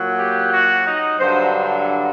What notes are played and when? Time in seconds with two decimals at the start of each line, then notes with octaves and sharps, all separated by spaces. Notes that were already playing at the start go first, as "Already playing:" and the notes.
Already playing: A#2 F#3
0.18 G4
0.53 F#4
0.85 D#4
1.19 G2 D3 F#3 C5